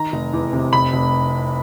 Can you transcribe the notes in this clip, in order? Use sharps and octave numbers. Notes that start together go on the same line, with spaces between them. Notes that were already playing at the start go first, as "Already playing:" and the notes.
Already playing: D#3 A#5
F1
E2
C3
F1 B5
F1